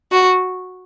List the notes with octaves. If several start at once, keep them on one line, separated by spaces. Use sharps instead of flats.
F#4